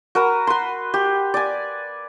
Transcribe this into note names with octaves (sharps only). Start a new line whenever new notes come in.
F#4 A#4 B4 A#5
B4 C6
G4
D5 G#5